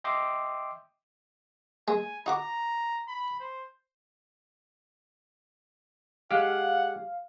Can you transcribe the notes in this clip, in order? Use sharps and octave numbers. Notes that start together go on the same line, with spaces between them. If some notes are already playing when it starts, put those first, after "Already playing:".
D#5 E5 G5 C6 D6
G#3 G#5
D#4 F#4 A#5 D6
B5
C5
G#3 G4 F5 F#5